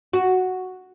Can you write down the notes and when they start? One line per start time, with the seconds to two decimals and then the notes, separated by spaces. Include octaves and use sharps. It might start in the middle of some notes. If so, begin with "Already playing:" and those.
0.13 F#4